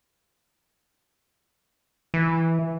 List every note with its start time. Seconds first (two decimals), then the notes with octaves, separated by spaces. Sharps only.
2.14 E3